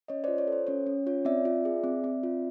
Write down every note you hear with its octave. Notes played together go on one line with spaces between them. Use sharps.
C#4 C#5 D#5
F4 C5 D5
C#5
A4 C5
C#4 C#5
C#4
F4 C#5
C4 D5 E5
F4
G#4
C4
C4
F4